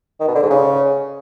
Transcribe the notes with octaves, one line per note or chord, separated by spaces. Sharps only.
D#3
B2
D3
G#2
C#3